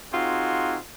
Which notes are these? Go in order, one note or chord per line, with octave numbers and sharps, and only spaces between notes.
C4 D#4 F4 F#4 G#4